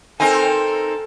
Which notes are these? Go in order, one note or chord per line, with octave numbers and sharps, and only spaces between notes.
C4 D#4 A4 A#4 G#5